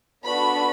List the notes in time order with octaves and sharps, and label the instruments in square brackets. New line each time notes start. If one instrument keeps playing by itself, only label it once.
[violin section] B3 D4 F#4 A4 B5